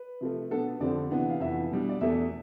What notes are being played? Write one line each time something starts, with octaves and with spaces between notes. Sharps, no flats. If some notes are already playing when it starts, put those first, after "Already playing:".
Already playing: B4
C3 F3 A3
B2 B3 D4 A4
F2 D3 F3 C4 D5
C3 E3 B3 D4
F5
F2 C3 E3 B3 E5
B2 G3 D4
D5
E2 B2 A3 E5